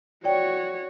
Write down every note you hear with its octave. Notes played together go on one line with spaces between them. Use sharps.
F#4 C#5 D5 G5